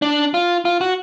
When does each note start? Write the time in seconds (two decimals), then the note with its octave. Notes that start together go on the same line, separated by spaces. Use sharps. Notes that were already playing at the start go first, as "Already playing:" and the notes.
0.02 D4
0.34 F4
0.65 F4
0.81 F#4